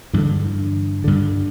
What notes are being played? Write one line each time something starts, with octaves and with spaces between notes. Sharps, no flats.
G2 D3 E3
G2 D3